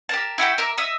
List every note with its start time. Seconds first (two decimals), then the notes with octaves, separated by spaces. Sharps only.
0.09 G4 A#4 A5
0.38 E4 F#4 G4 G5
0.58 A#4 E5 D6
0.78 D#5 E5 D#6